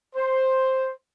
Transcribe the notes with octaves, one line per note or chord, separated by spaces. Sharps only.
C5